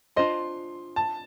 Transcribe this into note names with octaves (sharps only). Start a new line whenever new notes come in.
D4 F4 C5 D#5 C6
A5